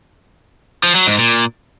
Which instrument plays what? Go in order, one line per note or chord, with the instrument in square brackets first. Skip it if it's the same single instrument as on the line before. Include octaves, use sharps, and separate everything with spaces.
[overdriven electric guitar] F3
F#3
G#2
A#2